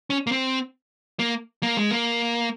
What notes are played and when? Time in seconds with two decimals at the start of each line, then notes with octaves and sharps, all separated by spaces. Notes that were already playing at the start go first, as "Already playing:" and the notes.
0.10 C#4
0.27 A#3
0.32 C4
1.19 A#3
1.63 A#3
1.77 G#3
1.91 A#3